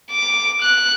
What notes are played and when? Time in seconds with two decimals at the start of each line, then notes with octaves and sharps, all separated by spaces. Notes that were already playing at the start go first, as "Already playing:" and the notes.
0.11 D6
0.62 F#6